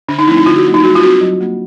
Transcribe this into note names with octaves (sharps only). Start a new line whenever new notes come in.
D3 D4
D#4
F3 A3 C4 E4
D#4
D3 F4
F#4
F#3 A#3 D4
D#4
G3 F#4
F4
C4 F#4
F#3
A#3 D4